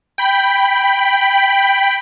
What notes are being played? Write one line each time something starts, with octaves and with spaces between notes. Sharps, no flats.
G5 B5